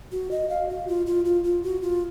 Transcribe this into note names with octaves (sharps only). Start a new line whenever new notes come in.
F#4
D#5
F5
F#4
F4
F4
F4
F4
F#4
F4